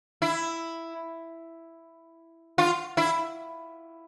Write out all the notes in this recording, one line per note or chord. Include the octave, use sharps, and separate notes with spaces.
E4
F4
E4